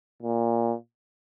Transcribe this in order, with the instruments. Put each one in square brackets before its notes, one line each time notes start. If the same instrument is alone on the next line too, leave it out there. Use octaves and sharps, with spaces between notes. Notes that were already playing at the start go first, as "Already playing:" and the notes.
[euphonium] A#2